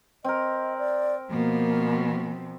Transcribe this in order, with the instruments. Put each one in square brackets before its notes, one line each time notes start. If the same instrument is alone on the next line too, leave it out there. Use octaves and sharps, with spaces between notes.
[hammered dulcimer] C4 A#4 [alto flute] D#5
[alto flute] D5
[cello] B2 F3 [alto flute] A#3